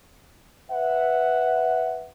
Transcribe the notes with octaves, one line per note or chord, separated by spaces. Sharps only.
B4 E5 F#5